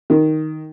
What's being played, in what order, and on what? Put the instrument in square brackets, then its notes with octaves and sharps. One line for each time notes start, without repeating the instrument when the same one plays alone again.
[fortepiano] D#3